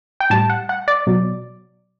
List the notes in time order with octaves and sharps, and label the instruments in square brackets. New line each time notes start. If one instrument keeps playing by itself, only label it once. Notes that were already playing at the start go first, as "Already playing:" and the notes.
[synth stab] G5
A2 G3 A5
F#5
F#5
D5
B2 F#3